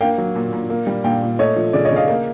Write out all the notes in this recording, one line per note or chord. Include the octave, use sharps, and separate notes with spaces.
A#3 F5 G5
F#3
A#2
A#2
A#3
G3
A#2 F5 G5
A#2
A3 C#5 D#5
F3
C#3 D5
C#5 D#5
C#3
D#5 F5
A#3